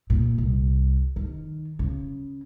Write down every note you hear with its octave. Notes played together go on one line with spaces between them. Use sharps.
A#2
C2
D#3
C#3